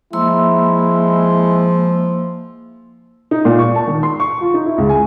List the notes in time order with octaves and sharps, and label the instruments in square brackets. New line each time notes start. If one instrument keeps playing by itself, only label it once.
[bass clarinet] F3 [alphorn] G#3 [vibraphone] A#3 C6 E6 [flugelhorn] E4
[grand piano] D#4
A#2
C#6
A5
D#3
C6
C#6
F4
D#4
E4
C#2
G#5